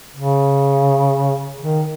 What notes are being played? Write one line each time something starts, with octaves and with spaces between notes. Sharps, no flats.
C#3
D#3